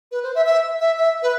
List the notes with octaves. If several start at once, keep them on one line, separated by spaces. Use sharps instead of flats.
B4
C5
E5
E5
E5
E5
B4